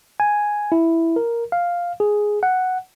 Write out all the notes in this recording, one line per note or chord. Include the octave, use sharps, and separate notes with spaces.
G#5
E4
A#4
F5
G#4
F#5